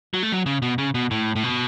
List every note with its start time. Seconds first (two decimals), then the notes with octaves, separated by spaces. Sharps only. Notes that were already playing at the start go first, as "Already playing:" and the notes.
0.14 F#3
0.23 A3
0.32 F#3
0.46 C#3
0.62 B2
0.78 C#3
0.94 B2
1.11 A2
1.36 A2
1.44 B2